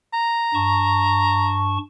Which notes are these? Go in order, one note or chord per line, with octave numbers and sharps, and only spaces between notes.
A#5
G2 A5 C#6